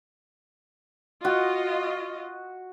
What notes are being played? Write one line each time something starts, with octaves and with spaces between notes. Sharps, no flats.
F4 F#4 D#5